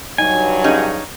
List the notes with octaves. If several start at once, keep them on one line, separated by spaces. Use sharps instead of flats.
G2 F#3 D#4 G#5
C#4 D#4 G4 G#4 F5